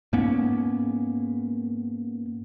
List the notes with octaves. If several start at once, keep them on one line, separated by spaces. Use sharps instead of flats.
G#2 A#3 B3 C#4